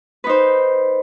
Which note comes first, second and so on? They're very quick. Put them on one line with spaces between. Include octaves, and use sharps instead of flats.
B4 D#4 C5